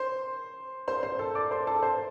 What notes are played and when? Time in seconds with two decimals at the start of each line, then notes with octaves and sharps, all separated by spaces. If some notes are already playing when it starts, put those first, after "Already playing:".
Already playing: C5 C6
0.88 C5 C6
1.03 C5 C6
1.19 A4 A5
1.35 D5 D6
1.51 C5 C6
1.67 A4 A5
1.82 C5 C6